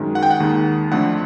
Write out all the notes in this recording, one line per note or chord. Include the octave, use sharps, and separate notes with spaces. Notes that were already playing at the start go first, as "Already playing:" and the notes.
Already playing: F#2 D#3 G#3
F#5
G5
F#5
D#2 D#3 G#3
F2 D3 F3 A3 F#5